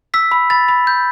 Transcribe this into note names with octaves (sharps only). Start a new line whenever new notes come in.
E6 B6
B5
B5 A6
B5
G6